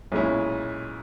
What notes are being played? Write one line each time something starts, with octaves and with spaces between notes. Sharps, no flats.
B1 A#2 G#3 C#4 E4